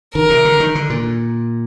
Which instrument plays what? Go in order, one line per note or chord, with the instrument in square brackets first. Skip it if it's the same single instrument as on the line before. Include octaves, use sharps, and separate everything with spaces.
[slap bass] D#3 [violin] A#4
[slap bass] C3
D3
D#3
D3
A#2